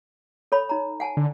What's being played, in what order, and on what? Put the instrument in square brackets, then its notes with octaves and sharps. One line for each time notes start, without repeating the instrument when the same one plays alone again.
[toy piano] A4 C#5 B5
D#4 A#5
F#5 G#5 A5
[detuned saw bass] D3